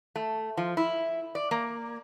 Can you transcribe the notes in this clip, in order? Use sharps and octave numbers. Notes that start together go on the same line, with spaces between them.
A3
F3
E4
D5
A#3